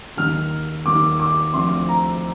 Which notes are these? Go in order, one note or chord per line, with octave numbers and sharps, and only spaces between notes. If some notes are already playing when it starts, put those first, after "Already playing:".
D#2 D#3 A#3 F6
D#2 D#3 A#3 D6
D6
D2 D3 F3 C4 C6
A#5